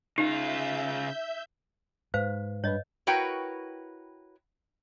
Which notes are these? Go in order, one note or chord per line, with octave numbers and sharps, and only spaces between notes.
C#3 D#4 F4 E5 G6
G#2 B4 C5 F5
G2 B4 C#5 D#5
E4 F#4 A#4 B4 C#5 G5